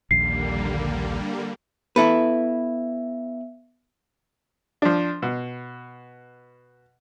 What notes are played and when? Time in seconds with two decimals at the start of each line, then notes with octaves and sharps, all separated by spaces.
0.11 A#1 D#2 D3 G3 A#3 C7
1.96 B3 E4 A4 B4 E5
4.82 F3 D4
5.22 B2